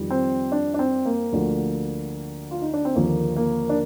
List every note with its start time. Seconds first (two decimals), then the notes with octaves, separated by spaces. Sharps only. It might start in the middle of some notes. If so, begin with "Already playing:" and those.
Already playing: F2 D#3 G3
0.11 C4
0.52 D4
0.74 D4
0.79 C4
1.06 A#3
1.32 D2 D3 F3
2.51 F4
2.62 D#4
2.73 D4
2.85 C4
2.95 D#2 D3 F3 A#3
3.36 A#3
3.69 D4